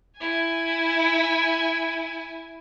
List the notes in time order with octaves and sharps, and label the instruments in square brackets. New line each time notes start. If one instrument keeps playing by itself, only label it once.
[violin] E4 G#5